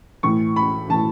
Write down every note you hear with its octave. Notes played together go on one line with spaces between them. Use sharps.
A2 E3 C#6
B5
A2 E3 A5